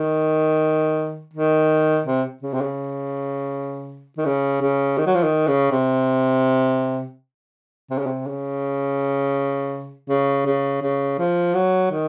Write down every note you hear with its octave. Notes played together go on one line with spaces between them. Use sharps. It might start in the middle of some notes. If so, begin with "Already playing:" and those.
Already playing: D#3
D#3
C3
C#3
C3
C#3
D#3
C#3
C#3
D#3
F#3
F3
D#3
C#3
C3
C3
C#3
C3
C#3
C#3
C#3
C#3
F3
F#3
D#3